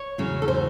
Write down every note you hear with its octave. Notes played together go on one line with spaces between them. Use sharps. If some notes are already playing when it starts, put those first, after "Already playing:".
Already playing: C#5
E2 C#3 F#3
A4
C5